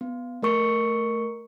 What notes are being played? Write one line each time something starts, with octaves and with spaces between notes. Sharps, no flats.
B3
A3 A#4 C#6 C#7